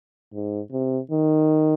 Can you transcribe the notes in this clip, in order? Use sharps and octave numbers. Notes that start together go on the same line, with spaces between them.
G#2
C3
D#3